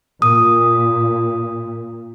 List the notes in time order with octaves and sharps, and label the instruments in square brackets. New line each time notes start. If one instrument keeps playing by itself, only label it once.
[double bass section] A#2 [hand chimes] D#6